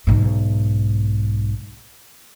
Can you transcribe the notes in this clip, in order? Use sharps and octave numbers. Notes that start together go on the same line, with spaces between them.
B1 G#2